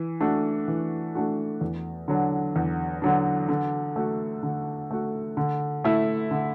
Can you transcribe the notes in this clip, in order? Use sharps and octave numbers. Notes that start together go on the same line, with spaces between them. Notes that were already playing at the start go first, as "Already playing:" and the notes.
Already playing: E3
A3 D4 F#4
E3
A3 D4 F#4
E2
D3 F#3 D4
E2
D3 F#3 D4
D3
A3 F#4
D3
A3 F#4
D3
A3 E4
D3